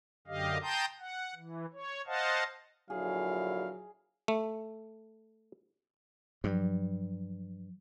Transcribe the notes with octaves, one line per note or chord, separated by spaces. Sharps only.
F#2 D3 G4 D#5 F5
G5 A5 A#5 C6 D#6 G6
F#5
E3
C#5
C5 D#5 F5 F#5 A5
A#1 D3 F#3 E4 G#4 F5
A3
G2 F3 F#3